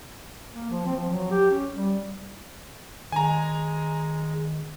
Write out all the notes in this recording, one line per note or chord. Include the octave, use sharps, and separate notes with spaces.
A#3
F3
C4
F3
F#3
G4
C#4
G3
D#3 G#3 G#5 A#5